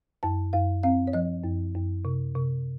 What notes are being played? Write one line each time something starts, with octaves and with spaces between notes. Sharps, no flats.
F#2 A5
F#2 F5
C4 F5
C#5
F3 D#5
F#2
F#2
C3
C3